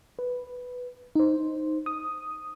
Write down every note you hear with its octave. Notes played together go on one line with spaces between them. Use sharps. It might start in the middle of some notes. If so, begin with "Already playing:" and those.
B4
D#4 C5
D#6